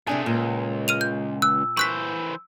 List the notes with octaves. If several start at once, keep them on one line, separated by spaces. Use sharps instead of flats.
C3 A3 D4 G#4 G#5
C#2 A#2
F6 D#7 F7
G6
E6 F#6
E3 C5 C#6 F#6 B6